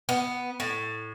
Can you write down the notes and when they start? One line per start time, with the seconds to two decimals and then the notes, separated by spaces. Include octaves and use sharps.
0.09 B3
0.60 A2